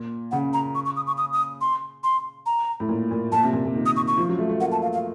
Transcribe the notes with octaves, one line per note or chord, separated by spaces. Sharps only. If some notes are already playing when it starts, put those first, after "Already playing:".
Already playing: A#2
C#3 F#5
A#5
C#6
C#6
D#6
C#6
D#6
D#6
C6
C6
A#5
A2
A#2
A#2
A#2 A5
C3
A#2
A#2
D#3
D#6
C#6
C#6
F3
F#3
A3
A3
A#3 F#5
A5
F5
F5